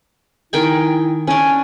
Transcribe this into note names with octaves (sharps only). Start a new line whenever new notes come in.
D#3 E4 G5 G#5
C#4 D4 G#5